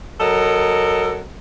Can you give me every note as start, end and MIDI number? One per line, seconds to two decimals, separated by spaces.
0.21 1.22 54
0.21 1.22 69
0.21 1.22 70
0.21 1.22 75